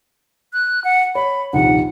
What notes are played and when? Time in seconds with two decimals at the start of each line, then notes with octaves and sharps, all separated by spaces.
0.53 F#6
0.84 F#5
1.15 C#5 B5
1.53 A#1 D#2 C3 F#5